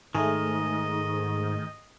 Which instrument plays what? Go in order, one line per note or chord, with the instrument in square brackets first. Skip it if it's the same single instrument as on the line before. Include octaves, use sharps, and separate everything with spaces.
[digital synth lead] G#2 [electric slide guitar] D#3 [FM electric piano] A3 G#4 [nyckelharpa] D#5